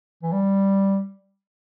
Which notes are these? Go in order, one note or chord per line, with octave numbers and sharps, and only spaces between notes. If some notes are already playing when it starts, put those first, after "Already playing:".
E3
G3